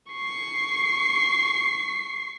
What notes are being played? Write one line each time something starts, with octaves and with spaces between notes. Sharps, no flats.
C#6 C7